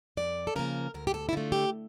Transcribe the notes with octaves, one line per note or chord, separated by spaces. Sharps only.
F2 D5
A4
C#3 F3 A#3 A#4
D2 A#4
G4
A4
E4
D3 A3 F4
G4